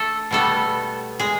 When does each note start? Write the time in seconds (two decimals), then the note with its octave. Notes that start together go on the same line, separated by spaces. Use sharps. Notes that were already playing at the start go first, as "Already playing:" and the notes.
Already playing: A3 A4
0.31 B2 G3 A3 B3 A4
1.19 G#3 G#4